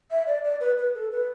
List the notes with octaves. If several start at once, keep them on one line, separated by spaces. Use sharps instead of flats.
E5
D5
D5
B4
B4
A4
B4